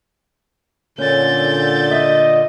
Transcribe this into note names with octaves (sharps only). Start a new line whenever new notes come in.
A#2 D3 C#4 G6 A6
D#5 E5